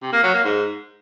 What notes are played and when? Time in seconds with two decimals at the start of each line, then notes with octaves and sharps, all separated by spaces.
0.02 C3
0.13 A#3
0.23 F#3
0.34 A#3
0.44 G#2